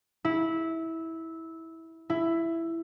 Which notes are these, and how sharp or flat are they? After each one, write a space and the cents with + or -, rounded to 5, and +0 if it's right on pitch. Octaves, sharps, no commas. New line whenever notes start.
E4 -15
E4 +10